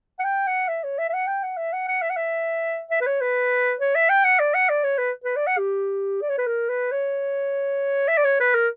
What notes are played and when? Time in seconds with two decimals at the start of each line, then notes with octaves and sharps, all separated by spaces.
0.19 F#5
0.24 G5
0.47 F#5
0.68 E5
0.84 C#5
0.98 E5
1.09 E5
1.13 F#5
1.27 G5
1.43 F#5
1.57 E5
1.73 F#5
1.88 F#5
2.02 E5
2.10 F#5
2.16 E5
2.90 E5
3.01 B4
3.06 C#5
3.21 B4
3.80 C#5
3.95 E5
4.09 G5
4.24 F#5
4.39 D5
4.54 F#5
4.69 D5
4.84 C#5
4.98 B4
5.24 B4
5.36 D5
5.47 F#5
5.58 G4
6.22 D5
6.29 C#5
6.38 B4
6.47 A#4
6.69 B4
6.91 C#5
8.08 E5
8.17 D5
8.24 C#5
8.40 B4
8.55 A#4